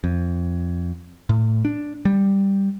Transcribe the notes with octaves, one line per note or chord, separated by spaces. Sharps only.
F2
A2
D4
G3